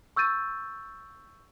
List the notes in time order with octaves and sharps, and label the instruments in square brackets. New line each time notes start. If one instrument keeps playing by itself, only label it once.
[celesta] C#6 E6 G6 A6 D#7